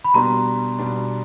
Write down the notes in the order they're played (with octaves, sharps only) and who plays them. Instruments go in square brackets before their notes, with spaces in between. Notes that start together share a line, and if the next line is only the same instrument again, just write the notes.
[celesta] B5
[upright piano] B2 G3 B3 D4 [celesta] A#5 C6
[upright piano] B2 G3 B3 D4